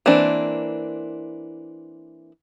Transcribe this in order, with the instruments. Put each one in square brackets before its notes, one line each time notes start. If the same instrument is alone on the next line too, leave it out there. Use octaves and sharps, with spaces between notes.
[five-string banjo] E3 A#3 C4 D4